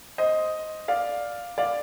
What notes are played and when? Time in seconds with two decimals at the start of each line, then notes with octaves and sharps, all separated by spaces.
0.18 C5 D#5
0.88 D5 F5
1.58 D5 F5